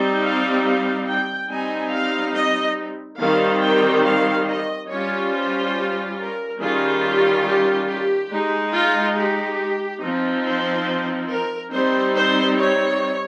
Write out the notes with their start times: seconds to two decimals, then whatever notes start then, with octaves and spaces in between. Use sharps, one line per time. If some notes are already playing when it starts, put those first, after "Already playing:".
Already playing: G3 C4 D#4
0.22 F5
0.64 F5
1.07 G5
1.49 G3 C4 D#4 G#5
1.92 F5
2.35 D#5
3.20 D#3 G3 C4 F5
3.63 G5
4.06 F5
4.48 D#5
4.91 G3 C#4 F4 C#5
5.33 C5
6.19 A#4
6.61 D#3 G3 C#4 F4 G#4
7.04 G4
7.47 G4
7.89 G4
8.32 G#3 D#4
8.74 F4
9.17 G4
10.03 F3 C4 D#4
10.45 C5
11.30 A#4
11.72 G3 C4 D#4 C5
12.16 C5
12.58 C#5